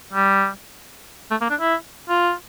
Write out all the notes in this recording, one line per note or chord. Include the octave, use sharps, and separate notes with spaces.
G3
A3
A#3
D4
E4
F4